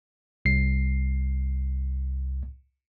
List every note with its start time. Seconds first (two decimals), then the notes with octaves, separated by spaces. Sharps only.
0.45 C2 C7